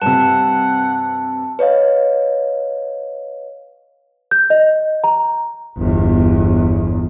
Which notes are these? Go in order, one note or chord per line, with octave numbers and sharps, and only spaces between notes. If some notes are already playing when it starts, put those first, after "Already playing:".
G2 C3 F#5 A5
B4 C#5 D#5 F5
G6
D#5
A#5
G1 E2